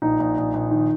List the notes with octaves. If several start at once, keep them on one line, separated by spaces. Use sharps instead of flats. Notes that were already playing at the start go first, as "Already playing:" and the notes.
A#1 D#4
A#1
A#1
A#1
D#3